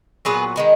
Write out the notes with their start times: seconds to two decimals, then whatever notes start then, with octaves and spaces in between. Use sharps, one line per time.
0.25 A#2 F#3 B3 G#4 B4
0.56 D#3 G#3 B3